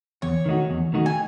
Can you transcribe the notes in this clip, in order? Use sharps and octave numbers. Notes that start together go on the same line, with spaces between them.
E2 C#5
D#3 A3 D#4 F#4
E2
D#3 A3 D#4 F#4
G#5